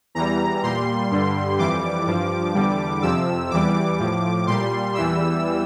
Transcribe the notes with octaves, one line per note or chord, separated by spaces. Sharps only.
E2 E3 G3 A#5
A#2 G3 C6
G2 D3 G3
F2 E3 G3 D6
G2 F3
E2 D3 G3
F2 C3 F3 E6
E2 E3 G3 D6
A2 F3
A#2 G3 C6
E2 E3 G3 E6